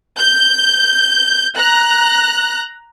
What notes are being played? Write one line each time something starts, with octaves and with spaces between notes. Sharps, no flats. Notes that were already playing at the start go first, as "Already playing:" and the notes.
G6
A#5 F#6